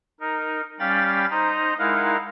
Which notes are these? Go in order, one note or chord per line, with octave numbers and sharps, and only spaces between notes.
D#4 A#4
G3 C#4 F5 G5 B5 A6
D#4 C5 D#5 A#5
G#3 D#4 E4 A#4 F5 F#5